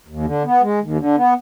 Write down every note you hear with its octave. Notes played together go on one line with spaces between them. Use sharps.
D#2
D3
B3
G#3
D#2
D3
B3